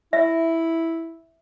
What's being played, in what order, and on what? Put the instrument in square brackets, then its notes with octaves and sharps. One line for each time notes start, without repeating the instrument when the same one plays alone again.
[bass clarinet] E4 [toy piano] E5